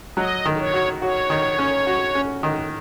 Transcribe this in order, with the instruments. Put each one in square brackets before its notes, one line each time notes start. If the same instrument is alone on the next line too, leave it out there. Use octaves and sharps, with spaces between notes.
[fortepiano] F#3 [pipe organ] D#5
[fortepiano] D#3
[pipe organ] C#5
[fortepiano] F#4
[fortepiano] F#4 [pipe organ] C#5
[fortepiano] D#3
C#4
F#4
C#4
D#3